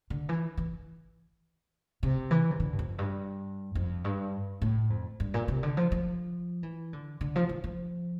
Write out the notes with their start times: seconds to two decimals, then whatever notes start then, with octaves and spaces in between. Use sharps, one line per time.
0.10 D3
0.29 E3
0.57 E3
2.03 C3
2.31 E3
2.51 C3
2.60 D3
2.73 G2
2.79 F2
2.99 G2
3.75 F2
4.04 G2
4.62 A2
4.90 F2
5.20 G2
5.34 A#2
5.48 C3
5.63 D3
5.77 F3
5.92 F3
6.63 E3
6.93 D3
7.21 D3
7.36 F3
7.49 E3
7.64 F3